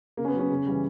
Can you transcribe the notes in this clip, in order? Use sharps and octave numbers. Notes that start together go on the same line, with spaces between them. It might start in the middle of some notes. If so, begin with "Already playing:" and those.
C#3 A#3
C#4
B3
F#3
C#4
C#3
E3 G3